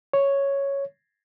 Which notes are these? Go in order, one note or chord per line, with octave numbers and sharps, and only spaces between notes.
C#5